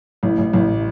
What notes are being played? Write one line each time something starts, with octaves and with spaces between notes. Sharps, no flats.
A1 A2
A1 A2
A1 A2